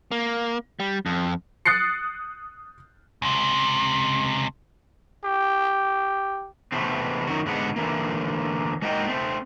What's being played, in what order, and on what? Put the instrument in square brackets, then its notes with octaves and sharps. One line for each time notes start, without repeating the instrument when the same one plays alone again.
[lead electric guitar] A#3
G3
F2
[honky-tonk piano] D#6 F#6 A6 C7 C#7
[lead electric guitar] C#2 C3
[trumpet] G4
[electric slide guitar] C3 E3 A3 B3 C4
F#2 D#3 F#4
G#2 D3 G#3 B3 D4 F#5
D3 E3 A#3
G#3 A#3 D#4 F#4 D#5 G5
A3 C4